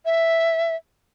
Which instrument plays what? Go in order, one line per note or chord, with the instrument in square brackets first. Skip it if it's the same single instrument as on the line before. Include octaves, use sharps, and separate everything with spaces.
[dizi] E5